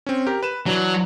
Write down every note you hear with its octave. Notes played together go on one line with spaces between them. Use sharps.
C4 C#4
G4 A#4
B4 E7
E3 F#3 D4